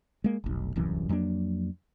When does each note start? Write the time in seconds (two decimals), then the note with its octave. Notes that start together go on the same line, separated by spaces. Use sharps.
0.24 G#3 A#3
0.44 F1 B1
0.76 D1 C2 F#2 E3
1.09 F2 F#3 A#3 D4